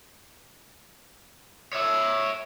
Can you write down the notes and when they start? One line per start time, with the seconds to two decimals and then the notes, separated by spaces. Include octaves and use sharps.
1.73 C#5 E5